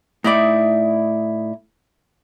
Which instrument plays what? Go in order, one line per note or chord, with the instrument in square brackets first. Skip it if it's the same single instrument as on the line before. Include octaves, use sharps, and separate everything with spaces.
[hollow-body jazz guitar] A2 E5 [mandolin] D#4 E4 D5